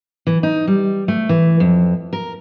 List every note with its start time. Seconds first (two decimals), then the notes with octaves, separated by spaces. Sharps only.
0.27 E3
0.43 D#4
0.67 G3
1.08 A3
1.29 E3
1.60 F2
2.13 A#4